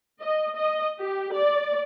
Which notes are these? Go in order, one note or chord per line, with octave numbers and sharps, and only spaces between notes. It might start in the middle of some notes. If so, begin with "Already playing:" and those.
D#5
D#5
G4
D5